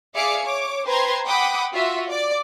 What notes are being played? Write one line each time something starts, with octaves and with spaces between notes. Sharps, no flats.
G#4 D5 E5 F5 D6 C#7
C#5 D6
B4 C5 G5 A#5 C6 G#6
F#5 G5 B5 D6 D#6
F4 F#4 E5
D5 D6